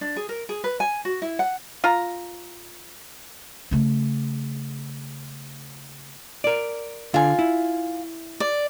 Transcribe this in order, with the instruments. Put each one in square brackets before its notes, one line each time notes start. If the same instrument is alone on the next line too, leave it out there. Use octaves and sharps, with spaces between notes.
[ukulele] D4
G#4
A#4
G#4
B4
G#5
F#4
E4
F#5
[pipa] F4 A#5
[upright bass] C#3 A3
[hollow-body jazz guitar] A#4 D5
[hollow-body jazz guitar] D3 [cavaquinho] F4 G#5
[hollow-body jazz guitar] E4
[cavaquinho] D5